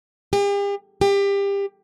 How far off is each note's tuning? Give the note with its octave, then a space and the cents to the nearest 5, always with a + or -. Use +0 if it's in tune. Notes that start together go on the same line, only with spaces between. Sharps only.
G4 +45
G4 +25